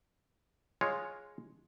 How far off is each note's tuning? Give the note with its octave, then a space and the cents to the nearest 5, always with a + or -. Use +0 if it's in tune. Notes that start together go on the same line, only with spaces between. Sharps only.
G#3 +0 F4 +0 C#5 +0